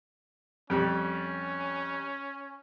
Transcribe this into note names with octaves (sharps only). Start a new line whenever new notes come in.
F2 G3 C#4